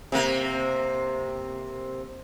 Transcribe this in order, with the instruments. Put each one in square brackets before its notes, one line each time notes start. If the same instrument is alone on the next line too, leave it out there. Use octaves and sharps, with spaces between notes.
[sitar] C3 A#3